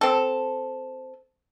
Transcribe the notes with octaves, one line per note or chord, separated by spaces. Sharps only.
C4 A4